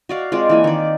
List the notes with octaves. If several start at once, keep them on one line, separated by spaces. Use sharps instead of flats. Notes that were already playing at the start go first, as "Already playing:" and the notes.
F#4 D5 F5
G#3 C4 F4 D5
E3 A#3 G#5
D#3 D5